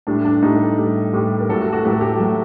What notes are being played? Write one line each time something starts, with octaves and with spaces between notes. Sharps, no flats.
A2 G3 D4
D4
A2 G3 D#4
A2 G3
A2 G3 G4
A#4
A2 F#3 A4
F#4
F#4
A2 F#3 G4
A4
G4
A2 F#3